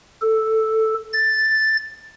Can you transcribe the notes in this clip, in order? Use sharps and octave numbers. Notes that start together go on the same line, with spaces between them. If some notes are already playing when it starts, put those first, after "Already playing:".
A4
A6